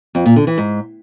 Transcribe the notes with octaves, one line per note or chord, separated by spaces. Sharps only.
F2
A#2
D3
E3
G#2